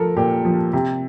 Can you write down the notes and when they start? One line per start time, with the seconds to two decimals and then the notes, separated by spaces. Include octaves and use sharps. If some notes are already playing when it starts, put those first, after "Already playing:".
Already playing: F3 A4 A#4
0.16 A#2 G4
0.45 F3
0.73 C3